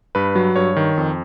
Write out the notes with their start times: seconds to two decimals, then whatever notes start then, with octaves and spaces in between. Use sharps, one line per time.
0.15 G2 B4
0.35 F#3
0.56 G2 C#5
0.76 D#3
0.97 F2